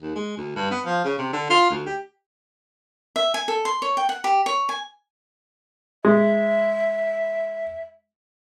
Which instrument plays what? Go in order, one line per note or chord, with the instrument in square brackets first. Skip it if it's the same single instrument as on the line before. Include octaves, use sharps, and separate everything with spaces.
[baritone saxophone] D#2
G#3
D2
G2
B3
F3
C#3
C3
D3
F4
D2
G4
[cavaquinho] E5
G#5
A4
C6
C#5
G5
F#5
G4
C#5
G#5
[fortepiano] G#3 [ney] E5